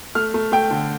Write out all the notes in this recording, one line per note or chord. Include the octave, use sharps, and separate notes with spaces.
A3 F6
A3
A3 G5
D3